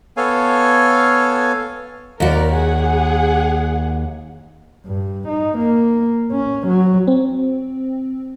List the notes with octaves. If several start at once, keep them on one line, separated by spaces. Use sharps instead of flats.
B3 A4 C#5 F5 G#5
D#2 F#4 A#4 D5
G#4 F#5
G2
D#4
A#3
C#4
F#3
C4